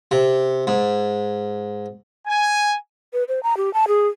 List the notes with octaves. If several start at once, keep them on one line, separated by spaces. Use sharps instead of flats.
C3
G#2
G#5
B4
C5
A#5
G4
A5
G#4